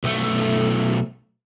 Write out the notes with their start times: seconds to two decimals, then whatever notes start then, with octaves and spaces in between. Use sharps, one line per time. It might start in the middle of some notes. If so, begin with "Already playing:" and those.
0.04 B1 A3